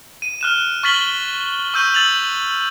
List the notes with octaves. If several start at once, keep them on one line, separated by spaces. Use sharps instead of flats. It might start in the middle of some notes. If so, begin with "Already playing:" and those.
D#7
F6 F#6 E7
C#6 F6 A6 B6 F#7 G7
C#6 E6 G6 D#7
E6 A6 F7 F#7